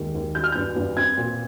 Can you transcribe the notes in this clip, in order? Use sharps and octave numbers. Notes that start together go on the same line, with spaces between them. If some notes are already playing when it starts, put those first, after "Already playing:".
Already playing: D#2 G#3
D#2
G3 G6
F6
G2 G6
G2
C4 G#6
A#2